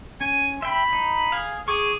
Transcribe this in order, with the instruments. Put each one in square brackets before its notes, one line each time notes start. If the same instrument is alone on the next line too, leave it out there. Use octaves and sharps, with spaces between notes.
[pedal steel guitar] C#4 [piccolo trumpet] G#5
[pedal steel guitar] E5 G5 [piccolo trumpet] B5
[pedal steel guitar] D#4
G#4 F5
[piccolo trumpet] G#4 [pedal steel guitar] C#6 D6